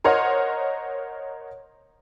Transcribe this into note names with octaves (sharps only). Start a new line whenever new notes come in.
A#4 C5 C#5 D#5 F#5 F6